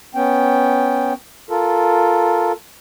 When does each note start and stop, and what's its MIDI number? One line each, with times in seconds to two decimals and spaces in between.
0.15 1.13 59
0.15 1.13 61
0.15 1.13 79
1.50 2.52 65
1.50 2.52 69
1.50 2.52 70